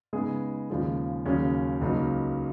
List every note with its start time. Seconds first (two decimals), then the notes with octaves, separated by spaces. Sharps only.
0.13 C#3 G#3 B3 D#4 G#4
0.70 D#2 C#3 F3 G#3
1.26 D#2 C#3 F#3 C#4 G#4
1.81 C#2 C#3 F#3 A#3 D#4